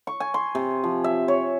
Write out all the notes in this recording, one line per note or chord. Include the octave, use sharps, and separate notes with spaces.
C#6
G#5
C6
C3
F3
E5
C#5